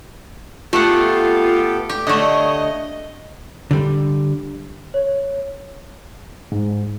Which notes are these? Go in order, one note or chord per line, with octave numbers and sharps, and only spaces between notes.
A3 B3 F4 G4 A4 F#5
G4
D3 A3 C#5 D#5 F#5
D3 G3
C#5
G#2